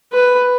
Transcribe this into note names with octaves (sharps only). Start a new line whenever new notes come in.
B4